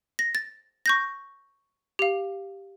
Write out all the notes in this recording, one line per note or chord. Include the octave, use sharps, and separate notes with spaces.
A#6
A6
C#6 G6 A#6
G4 F5